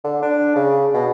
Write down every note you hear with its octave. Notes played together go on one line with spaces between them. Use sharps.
D3
D4
C#3
B2